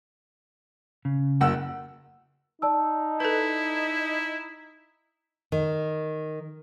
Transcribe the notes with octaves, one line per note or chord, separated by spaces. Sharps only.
C#3
F#1 F#5 E6
D#4 D5 A5 E6
E4 A4 B4
D#3